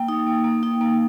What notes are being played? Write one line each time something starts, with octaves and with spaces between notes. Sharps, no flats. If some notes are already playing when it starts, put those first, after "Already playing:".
Already playing: A#3 G5
D#4
A#3
A#3
D#4
A#3